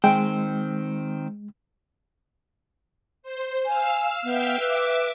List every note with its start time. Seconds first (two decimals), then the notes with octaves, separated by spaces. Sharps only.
0.04 D#3 G#3 C4 G5
3.23 C5
3.66 F5 G#5 E6
4.23 B3 E5 F5 G5
4.60 B4 E5 D6